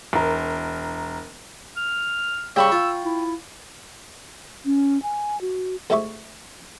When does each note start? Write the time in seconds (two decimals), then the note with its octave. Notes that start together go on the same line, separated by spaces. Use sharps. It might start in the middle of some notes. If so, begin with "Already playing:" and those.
0.13 E1 A#4
1.77 F6
2.56 C#3 G3 G5 B5 C#6 E6
2.72 F4
3.03 E4
4.65 C#4
5.03 G#5
5.41 F#4
5.90 D2 G#2 E4 G4 E5 C#6